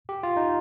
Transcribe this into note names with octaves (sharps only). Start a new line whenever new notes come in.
G4
F4
D#4